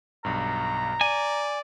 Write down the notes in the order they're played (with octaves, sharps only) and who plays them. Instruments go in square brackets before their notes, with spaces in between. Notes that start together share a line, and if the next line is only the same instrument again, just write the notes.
[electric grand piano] B1 G2 [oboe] A#5
[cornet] D5 [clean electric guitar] G#5 [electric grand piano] D#7